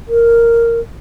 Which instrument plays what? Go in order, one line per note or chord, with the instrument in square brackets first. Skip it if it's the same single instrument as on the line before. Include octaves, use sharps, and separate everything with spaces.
[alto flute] A#4